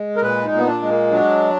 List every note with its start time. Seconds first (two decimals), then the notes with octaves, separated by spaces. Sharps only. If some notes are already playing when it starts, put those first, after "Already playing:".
Already playing: G#3
0.16 A#4
0.22 A#2 B4
0.45 D#4
0.52 A#2
0.58 B3
0.66 D4
0.82 G#3
0.89 A#3
1.11 F#3 D4